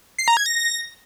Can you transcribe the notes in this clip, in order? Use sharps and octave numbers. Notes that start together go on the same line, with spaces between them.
C7
A#5
G#6
A#6